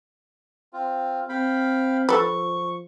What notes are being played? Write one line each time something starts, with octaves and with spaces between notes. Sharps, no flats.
C4 F4
C4 F5 G5 B5
F3 A4 B4 C#6